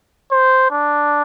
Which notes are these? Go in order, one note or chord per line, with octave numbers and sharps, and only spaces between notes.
C5
D4